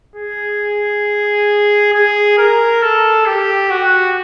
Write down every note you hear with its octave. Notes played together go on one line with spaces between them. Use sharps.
G#4
G#4
A#4
A4
G4
F#4